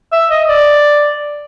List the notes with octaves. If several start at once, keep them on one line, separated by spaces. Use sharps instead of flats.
E5
D#5
D5